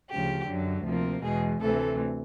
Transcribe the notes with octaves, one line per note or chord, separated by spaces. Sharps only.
D2 C#3 F3 G4
F#2 D3 F#3
D2 C3 F3 A#3
E2 B2 G#3 G#4
D2 C3 E3 A3 A4